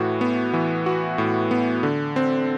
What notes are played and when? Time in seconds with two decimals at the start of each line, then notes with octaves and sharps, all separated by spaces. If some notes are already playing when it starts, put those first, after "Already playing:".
Already playing: A2 E3 F#4
0.21 B3
0.53 E3
0.86 F#4
1.18 A2
1.51 B3
1.83 D3
2.16 C4